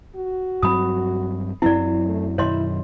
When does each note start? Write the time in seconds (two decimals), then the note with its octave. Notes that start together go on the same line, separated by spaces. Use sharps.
0.16 F#4
0.63 G2 F#3 C4 B5 D#6
1.62 F#2 F#3 C4 E4 D5
2.06 A3
2.38 F#2 B2 D#3 E4 C#5 D#5 C6